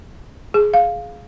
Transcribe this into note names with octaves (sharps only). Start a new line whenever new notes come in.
G#4
F5